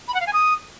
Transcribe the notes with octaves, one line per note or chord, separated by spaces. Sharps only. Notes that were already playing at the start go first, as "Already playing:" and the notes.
B5
F#5
F5
G#5
D#6